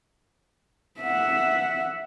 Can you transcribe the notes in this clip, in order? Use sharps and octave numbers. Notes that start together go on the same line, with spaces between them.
E5 F#5